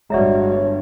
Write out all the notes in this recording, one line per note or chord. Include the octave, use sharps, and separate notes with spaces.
G1 G2 G#3 F#4 C#5 D5 E5 A#5